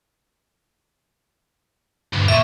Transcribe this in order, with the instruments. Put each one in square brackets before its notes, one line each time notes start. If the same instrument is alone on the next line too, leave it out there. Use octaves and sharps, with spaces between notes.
[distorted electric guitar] D2 G2
[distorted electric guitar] A#2 [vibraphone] E5 C#6